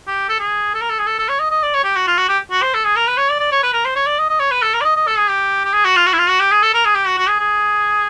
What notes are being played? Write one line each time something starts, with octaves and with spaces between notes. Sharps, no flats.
G4
A4
G#4
A4
A#4
A4
G#4
A4
A4
C#5
D#5
D#5
D5
C#5
G4
F#4
F4
F#4
G4
F#4
C5
A4
G#4
A#4
B4
C#5
D5
D5
C#5
B4
A#4
C5
C#5
D5
D#5
D#5
C#5
B4
A4
A#4
D5
D#5
D#5
A4
G#4
G4
G4
G#4
F#4
F4
F#4
E4
F4
F#4
G4
G#4
A4
A#4
G#4
G4
F#4
F#4
G#4
G#4